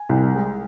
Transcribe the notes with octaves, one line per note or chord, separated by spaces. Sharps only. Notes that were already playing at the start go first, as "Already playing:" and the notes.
Already playing: G#5
C2
G#3